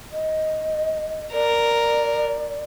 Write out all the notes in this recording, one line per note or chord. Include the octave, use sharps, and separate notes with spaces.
D#5
A#4 D5